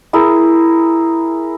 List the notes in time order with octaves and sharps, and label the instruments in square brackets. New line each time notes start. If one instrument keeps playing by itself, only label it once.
[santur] E4 G#4 A#4